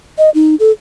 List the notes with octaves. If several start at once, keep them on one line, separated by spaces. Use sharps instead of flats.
D#5
D#4
A4